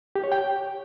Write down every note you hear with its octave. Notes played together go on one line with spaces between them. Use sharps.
G4
C#5
G5